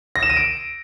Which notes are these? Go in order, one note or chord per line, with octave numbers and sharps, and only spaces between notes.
A#6
E7
D#7
D7